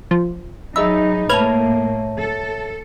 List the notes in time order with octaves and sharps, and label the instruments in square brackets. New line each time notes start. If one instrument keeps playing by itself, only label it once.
[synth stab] F3
[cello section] F#3 D#4 [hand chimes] G#4 D#5 B5 [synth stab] E5
[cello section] A2 A#3 [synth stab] B4 F6 G#6 [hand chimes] C#5 E5 A5
[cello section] A4